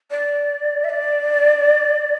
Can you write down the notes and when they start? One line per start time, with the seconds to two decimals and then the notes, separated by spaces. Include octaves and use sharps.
0.11 D5
0.84 E5
0.89 D5